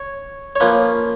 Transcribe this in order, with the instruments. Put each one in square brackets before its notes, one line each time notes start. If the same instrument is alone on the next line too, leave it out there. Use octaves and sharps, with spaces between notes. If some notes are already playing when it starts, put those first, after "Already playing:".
Already playing: [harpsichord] C#5
C#5
F3 A#3 C#4 B4